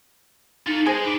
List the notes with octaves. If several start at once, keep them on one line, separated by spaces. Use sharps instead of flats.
D#4 F4 A4
G#3 G#4 C5
D#4 B4 D5